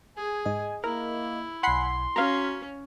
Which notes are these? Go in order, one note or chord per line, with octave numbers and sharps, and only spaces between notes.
G#4 G#5
G#2 D#5
A#3 E4 A#4
B1 F#5 G#5 B5 C6 C7
C#4 F#4 F5 A#5 B6